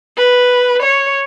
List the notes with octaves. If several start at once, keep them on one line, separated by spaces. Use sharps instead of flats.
B4
C#5